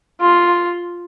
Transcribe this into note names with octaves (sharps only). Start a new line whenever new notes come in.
F4